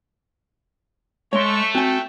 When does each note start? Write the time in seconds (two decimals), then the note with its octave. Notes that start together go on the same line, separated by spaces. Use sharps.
1.33 G#3 A3 C#5 C6 C#6
1.75 C4 F#4 G5 G#5